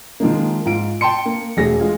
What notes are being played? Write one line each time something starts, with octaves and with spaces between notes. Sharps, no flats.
D#3 F3 G#3 A#3
G#2 F4 D7
G5 A5 C6 C#7
A#3
E1 A3 G#4 A#6
G#3 F4 G#4